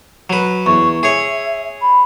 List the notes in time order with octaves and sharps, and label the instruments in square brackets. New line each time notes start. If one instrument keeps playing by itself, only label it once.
[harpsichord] F#3 B4
[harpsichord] E2 [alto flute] C#6
[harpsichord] G#4 C#5 [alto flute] E5
[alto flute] B5